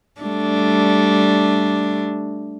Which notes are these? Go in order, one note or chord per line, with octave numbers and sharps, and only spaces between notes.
G3 A3 D4